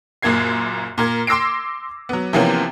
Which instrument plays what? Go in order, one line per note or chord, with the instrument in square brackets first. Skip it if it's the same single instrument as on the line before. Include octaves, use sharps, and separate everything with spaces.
[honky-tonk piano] F#1 F#2 A#2 A#3 G#6 C7
A#2 A#4 G#6
C6 D6 E6 A#6 C7 D7
F#3 B3
C3 E3 F3 A#3 B3 C#4